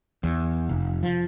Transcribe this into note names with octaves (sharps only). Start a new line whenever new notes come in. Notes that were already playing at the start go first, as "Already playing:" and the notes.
E2
F1
F3